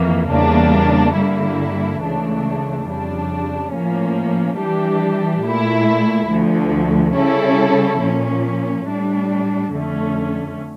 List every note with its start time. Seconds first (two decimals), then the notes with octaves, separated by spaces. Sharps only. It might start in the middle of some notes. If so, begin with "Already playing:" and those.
Already playing: F2 E3 A#3
0.29 E2 C#3 G3 A#3 D4
1.15 G2 D3 G3 A#3 E4
2.01 C#2 C#3 E3 A3 D4
2.87 F2 C#3 G3 D4
3.72 A2 F3 A#3 C#4
4.58 E3 G3 D4 G4
5.43 A#2 A3 E4
6.30 D2 D3 F3
7.15 C#3 G3 C#4 E4 A4
8.01 A#2 F3 C#4
8.86 A2 G3 D4
9.72 F2 D3 A3 C#4